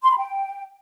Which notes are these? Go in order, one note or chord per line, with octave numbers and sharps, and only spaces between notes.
C6
B5
G5